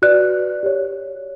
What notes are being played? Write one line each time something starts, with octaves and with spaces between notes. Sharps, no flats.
F#4 B4 D5 F#6
G4 C#5